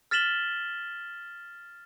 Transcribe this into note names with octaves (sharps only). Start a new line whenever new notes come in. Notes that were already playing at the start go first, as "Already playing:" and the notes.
F6 A6 B6 E7 F#7 G7